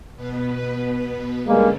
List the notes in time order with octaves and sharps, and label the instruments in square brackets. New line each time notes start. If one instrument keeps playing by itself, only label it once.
[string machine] B2 B3 B4
[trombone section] G2 G#3 A#3 [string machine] D3 G3 C#4